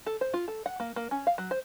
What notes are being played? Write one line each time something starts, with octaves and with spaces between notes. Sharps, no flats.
A4
C5
F4
A4
F#5
A#3
A#3
C#4
F5
F#3
C5